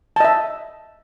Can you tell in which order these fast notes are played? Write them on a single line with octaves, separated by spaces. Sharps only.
A5 D#5 E5